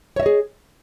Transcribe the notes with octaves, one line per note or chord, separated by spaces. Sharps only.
G#4 C#5 D#5 E5